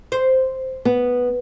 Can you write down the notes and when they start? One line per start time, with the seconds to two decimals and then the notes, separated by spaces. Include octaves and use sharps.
0.12 C5
0.85 B3